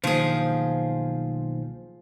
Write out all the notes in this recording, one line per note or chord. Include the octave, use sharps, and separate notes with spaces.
B1 D#3 F3 A#3 G#4 C5